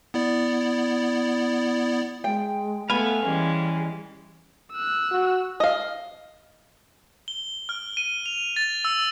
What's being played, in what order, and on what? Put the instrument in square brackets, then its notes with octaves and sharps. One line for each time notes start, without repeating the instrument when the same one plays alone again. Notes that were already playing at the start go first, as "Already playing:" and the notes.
[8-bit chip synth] B3 E4 D5
[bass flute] G#3 [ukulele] G5
[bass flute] A3 [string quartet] B3 [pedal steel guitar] F5 G#5 [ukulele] B5
[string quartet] E3 G#3 C#4 [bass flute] G3
[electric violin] E6 F#6
[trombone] F#4
[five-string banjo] D#5 F5
[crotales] G7
F6
D#7
F7
A6
E6